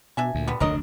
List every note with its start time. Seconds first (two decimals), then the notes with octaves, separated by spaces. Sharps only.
0.17 B2 D4 E5 G#5
0.35 D2 A#2
0.47 D3 G3 B3
0.60 F1 D2 D3 D4 A#4 C#5 D#5